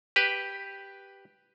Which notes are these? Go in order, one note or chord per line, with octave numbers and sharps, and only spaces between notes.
G4 B4